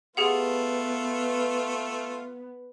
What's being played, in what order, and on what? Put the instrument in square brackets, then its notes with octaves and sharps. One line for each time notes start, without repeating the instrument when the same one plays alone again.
[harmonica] A3 F4 [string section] B3 [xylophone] G4 G#4 F#5